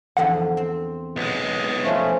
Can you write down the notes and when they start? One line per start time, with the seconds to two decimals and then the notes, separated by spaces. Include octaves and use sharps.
0.17 E2 D3 F3 F#5
0.57 C4
1.16 B1 G#3
1.83 F3 A3 C#4